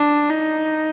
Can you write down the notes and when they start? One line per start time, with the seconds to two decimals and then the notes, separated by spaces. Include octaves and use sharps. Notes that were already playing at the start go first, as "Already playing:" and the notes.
Already playing: D4
0.30 D#4